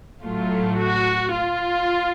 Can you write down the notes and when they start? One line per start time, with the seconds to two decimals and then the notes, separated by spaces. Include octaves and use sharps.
0.22 A2 F#3 A3 F4
0.78 F#4
1.34 F4